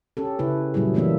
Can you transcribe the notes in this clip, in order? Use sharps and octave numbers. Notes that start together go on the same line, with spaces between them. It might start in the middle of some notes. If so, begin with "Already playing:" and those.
C#4 G4 A4
C#3 E4 B4
A#2 F#3 G3 E4 G#4
E3 A3 A#3 D4 E5